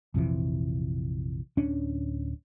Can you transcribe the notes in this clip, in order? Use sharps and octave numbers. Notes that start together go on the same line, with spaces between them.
A#1 F2 C3 E3
D1 C#4 D4